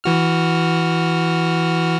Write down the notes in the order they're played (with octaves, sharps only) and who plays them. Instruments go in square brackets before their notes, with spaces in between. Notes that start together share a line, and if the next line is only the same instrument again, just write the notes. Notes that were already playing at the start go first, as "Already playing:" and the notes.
[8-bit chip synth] E3 F#4 F6